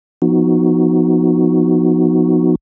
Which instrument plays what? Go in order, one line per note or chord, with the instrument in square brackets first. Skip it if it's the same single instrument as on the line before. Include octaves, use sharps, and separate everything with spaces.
[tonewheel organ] F3 B3 D#4 F#4